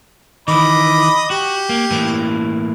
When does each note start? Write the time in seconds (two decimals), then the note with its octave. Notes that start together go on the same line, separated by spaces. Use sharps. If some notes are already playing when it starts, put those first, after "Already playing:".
0.48 D#3 E3 D#5 B5 D6
1.30 F#4 G4
1.69 A#3
1.91 A2 E3 A#3